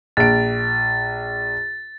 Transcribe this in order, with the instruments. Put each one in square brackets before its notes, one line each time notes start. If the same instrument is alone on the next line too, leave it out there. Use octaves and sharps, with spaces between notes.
[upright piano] A#1 D7 [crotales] A6